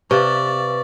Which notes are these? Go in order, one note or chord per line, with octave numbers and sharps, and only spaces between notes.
C3 B4 D5 F5 C#6 A6